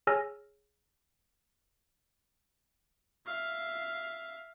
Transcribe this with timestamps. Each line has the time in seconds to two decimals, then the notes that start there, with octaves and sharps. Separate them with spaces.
0.07 G#4 C#5 G#5 E6 F6 A#6
3.26 E5 F5